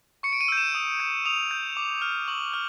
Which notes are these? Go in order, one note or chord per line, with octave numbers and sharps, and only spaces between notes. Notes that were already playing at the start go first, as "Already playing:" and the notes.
C#6 C#7
D7
D#7
E6 G6
E7
D#6
G6
D#6 F7
G6
D6
F6
C#6 F#7
F6